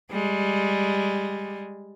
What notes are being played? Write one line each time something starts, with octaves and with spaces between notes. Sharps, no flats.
G3 G#3